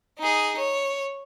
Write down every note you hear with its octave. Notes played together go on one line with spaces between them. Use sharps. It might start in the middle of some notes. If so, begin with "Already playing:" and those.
D#4 G#4
C#5